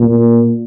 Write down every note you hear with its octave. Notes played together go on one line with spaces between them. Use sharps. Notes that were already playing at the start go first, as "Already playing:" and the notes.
Already playing: A#2